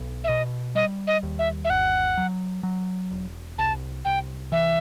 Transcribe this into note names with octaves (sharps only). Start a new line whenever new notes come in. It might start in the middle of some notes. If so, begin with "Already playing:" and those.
Already playing: B1
E5
B2 D#5
G3 D#5
D#5
D#2
E5
E5
G1 F#5
F#3
F#3
E1
C2 A5
C2 G5
E3 E5